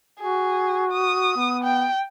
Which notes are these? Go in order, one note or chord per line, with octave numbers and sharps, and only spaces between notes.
F#4 G#4
D#6
B3
G5